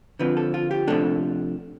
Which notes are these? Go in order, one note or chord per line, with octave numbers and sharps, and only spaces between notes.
D3 F3 C4 B4
A4
F4
G4
C3 F3 A3 D4 A4